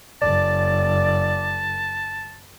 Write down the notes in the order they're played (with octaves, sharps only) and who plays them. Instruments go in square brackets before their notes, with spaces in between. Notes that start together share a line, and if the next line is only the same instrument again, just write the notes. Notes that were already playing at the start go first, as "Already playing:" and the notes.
[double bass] F#1 [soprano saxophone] D5 [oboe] A5